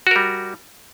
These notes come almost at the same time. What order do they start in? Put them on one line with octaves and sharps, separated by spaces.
F#4 A#4 G3